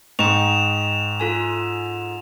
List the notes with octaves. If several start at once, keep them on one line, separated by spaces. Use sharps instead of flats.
G#2 D#5 G5 C#6 E7 F7
F4 A4 G#5